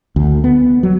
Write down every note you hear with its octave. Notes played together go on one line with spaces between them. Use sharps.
D2
B3
F#3